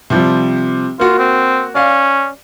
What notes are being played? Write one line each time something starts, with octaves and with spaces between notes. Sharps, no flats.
C3 F3 G3
A#3 F4 F#4
C4
C#4 D5 F5